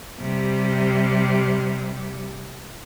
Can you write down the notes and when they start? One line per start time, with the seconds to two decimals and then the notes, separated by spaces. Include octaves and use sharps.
0.20 C3 G3